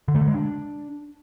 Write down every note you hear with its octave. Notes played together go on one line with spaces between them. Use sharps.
D3
A3
D3
G#3
D4